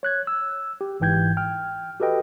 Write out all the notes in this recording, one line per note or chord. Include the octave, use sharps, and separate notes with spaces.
C#5 F#6 G#6
E6
G4
G1 G#2 E3 G5 G6 G#6
G5 F6
F#4 G4 A4 B4 D#5 G5